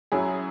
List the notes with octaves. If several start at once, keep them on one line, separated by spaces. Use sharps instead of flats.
F#2 F#3 E4 G#4